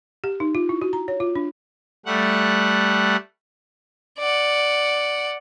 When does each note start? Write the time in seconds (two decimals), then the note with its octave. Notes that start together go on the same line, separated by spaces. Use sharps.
0.24 G4
0.40 D#4
0.55 F4
0.69 E4
0.82 F#4
0.93 A#5
1.08 C#5
1.20 F4
1.36 D4
2.06 G3 A3 F#5
4.19 D5 F#5